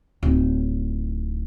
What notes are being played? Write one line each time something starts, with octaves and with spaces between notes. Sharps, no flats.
D1 D#4